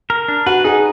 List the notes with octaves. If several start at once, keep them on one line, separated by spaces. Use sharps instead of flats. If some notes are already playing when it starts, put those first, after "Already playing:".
A#4
D4
F#4 B4
D#4 G#4